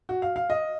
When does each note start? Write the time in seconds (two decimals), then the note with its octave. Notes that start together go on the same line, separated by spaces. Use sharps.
0.09 F#4
0.22 F5
0.36 F5
0.50 D#5